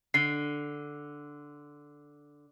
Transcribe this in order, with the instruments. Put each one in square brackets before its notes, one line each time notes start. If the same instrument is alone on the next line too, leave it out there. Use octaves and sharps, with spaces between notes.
[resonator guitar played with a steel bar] D3 [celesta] C7